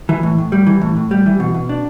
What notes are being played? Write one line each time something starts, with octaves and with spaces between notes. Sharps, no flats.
E3
A2
A2
G3
E3
A2
A2
G3
E3
B2
B2
D4